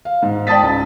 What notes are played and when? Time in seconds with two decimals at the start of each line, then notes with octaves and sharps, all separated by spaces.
0.05 F5
0.22 G#2
0.47 D5 G5 A5 D#6 A6 B6
0.63 C#2